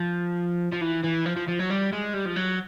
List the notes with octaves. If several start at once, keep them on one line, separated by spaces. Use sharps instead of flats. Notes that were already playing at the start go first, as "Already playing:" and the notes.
Already playing: F3
F3
E3
E3
F3
F3
F3
F#3
G3
G#3
G3
F3
F#3